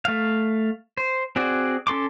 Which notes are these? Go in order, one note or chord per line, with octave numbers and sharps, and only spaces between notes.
A3 F5
C5
C4 F#4 G#4 D5
C#4 A4 C6 D6